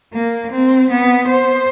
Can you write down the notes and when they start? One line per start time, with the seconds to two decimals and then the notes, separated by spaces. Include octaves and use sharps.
0.14 A#3
0.51 C4
0.90 B3
1.27 C5